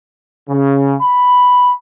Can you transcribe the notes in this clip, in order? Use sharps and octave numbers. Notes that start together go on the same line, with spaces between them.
C#3
B5